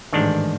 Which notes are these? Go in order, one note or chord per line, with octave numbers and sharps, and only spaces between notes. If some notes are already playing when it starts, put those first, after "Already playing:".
A1 G#2 D#3 D4